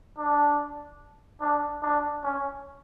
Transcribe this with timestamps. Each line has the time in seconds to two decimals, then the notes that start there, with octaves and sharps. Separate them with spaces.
0.18 D4
1.41 D4
1.83 D4
2.23 C#4